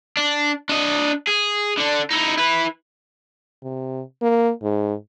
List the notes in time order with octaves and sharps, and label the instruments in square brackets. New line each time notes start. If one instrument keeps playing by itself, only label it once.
[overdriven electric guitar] D4
D4 D#5
G#4
D3 D4
D#4 E4
E4 B4
[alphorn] C3
A#3
G#2